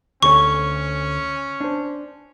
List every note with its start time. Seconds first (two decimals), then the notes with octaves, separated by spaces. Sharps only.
0.23 D2 C#4 A4 C#5 C#6
1.61 D4 C5